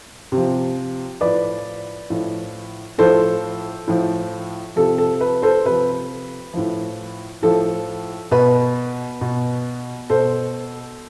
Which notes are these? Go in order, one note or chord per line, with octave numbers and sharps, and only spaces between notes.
C3
F3
A2 F3 B4 D5
A2 F3
A2 F3 A4 C5
A2 F3
C3 F3 A4
A4
B4
A4 C5
C3 F3 B4
A2 F3
A2 F3 A4
B2 B4
B2
B2 A4 C5